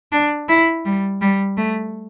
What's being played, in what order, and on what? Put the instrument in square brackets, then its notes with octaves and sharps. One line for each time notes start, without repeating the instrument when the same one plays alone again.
[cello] D4
E4
G3
G3
A3